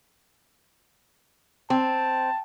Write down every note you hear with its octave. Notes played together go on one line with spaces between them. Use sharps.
C4 A5